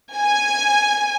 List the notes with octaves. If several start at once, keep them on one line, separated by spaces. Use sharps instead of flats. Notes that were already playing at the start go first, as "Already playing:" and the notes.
G#5